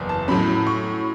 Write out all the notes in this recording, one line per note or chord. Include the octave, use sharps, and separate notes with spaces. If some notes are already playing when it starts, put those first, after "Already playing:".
Already playing: F#1 E2 B3
A5
A2 F#3 C#4 B5
C#6